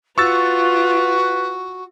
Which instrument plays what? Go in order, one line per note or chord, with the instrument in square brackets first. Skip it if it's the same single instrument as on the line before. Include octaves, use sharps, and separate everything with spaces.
[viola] F4 [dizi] F#4 [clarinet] B4 [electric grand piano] C#6 E6 A6